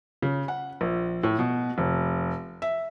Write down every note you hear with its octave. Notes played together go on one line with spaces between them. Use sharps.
C#3
F#5
A#1
A2
B2
F1
E5